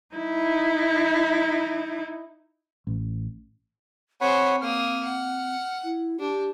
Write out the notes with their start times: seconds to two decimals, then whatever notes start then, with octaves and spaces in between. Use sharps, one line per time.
0.15 D#4 E4
2.87 A1
4.21 C4 G#4 C5 C#5 F#5 B5
4.62 A#3 D#6 F6
5.03 F#5
5.84 E4
6.20 D4 G4